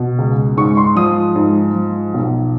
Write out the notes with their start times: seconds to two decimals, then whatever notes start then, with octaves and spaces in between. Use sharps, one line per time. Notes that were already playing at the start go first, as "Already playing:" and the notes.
Already playing: B2
0.18 C#2
0.57 G#2 C#6
0.77 C6
0.96 F3 D#6
1.35 G#2
1.74 F3
2.14 B1